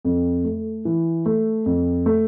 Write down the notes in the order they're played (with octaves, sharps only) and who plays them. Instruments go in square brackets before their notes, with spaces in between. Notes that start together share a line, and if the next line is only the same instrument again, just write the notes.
[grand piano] F2
A3
E3
A3
F2
A3